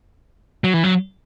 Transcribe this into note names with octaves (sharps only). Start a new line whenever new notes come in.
F#3
E3
F#3